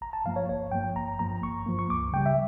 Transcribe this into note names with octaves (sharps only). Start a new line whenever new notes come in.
G1 A#5
A5
G2 F3 A#3 F5
C#5
G1 C#5
G2 F3 A#3 G5
G1 A#5
G2 F3 A#3 A#5
G1 C#6
G2 F3 A#3
C#6
C#2 D6
C#3 G3 G5
E5